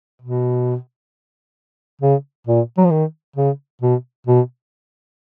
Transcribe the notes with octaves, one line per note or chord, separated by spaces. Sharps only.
B2
C#3
A#2
F#3
F3
D#3
C#3
B2
B2